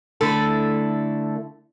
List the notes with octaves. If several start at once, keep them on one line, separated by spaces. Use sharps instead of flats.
D3 A3 E4 A4